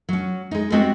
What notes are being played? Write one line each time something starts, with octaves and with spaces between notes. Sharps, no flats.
F#3 C#4
G#3 D#4
G3 G#3 B3 C4 F#4